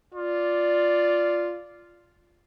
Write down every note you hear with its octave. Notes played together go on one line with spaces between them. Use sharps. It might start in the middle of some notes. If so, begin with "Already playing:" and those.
F4 D5